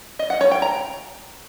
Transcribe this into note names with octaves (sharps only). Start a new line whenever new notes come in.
D#5
F#5
C#5
G5
A#5